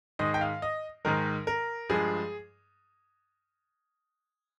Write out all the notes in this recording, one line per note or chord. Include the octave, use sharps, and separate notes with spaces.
G#2 D#3 G#3 D#5
G5
F5
D#5
G#2 D#3 G#3 A#4
A#4
G2 F3 G#3 G#4